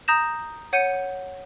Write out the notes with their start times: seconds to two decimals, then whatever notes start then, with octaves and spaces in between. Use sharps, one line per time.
0.08 A#5 D#6 G6 A#6 E7
0.73 C#5 F#5 G6 C#7 D#7